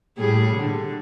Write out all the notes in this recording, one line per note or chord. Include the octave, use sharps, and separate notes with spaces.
A2 G3 G#4
D3